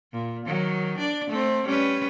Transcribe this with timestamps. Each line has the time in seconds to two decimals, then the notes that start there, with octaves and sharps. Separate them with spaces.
0.13 A#2
0.45 D#3 F#3
0.98 D4 D5
1.30 A3 C4
1.66 G3 C#4 B4